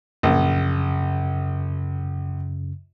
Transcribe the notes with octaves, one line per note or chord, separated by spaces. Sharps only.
A#1 F#2 C#3